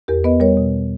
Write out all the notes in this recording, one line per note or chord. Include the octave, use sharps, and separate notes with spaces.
E2 G4 A#4
B3 B4 D#5
G3 A#4 C#5
B2